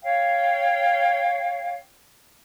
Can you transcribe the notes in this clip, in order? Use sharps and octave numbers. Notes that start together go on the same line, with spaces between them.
C#5 F5 G5